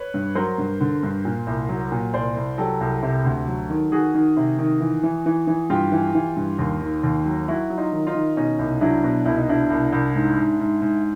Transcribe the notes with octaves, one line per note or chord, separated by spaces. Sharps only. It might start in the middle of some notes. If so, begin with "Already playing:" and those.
Already playing: B4 C#5
G2
F#3 A#4 C5
G2
D3
G2
A#2
C2
F#3
A#2
C2 C5 D5
C2
F#3 G4 A4
C2
C3
D2
F#3
D#3
D#3 F#4 G#4
D#3
C3
D#3
E3
E3
E3
E3
G2 F4 G4
E3
E3
G2
D#2
D#3
D#2
F#3
F#3 E4 F#4
F#3
D#4 F4
D#3
D#4 F4
D#3
B2 C#4 D#4
C2
F#3 D4 E4
B2
C2 E4
D#4
B2 D4 E4
C2
C2
G#2
G#2
G#2
G#2